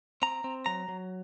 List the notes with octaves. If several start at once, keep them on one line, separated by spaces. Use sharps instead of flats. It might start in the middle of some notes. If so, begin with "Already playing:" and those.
C4 A#5
C4
F#3 A#5
F#3